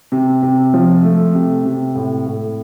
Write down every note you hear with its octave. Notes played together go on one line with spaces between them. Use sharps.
C3
C3
F3
A3
C3
C3
A2
A2